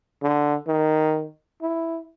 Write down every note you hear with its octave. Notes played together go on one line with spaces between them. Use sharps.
D3
D#3
E4